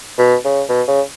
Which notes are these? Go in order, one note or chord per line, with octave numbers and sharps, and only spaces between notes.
B2
C#3
B2
C#3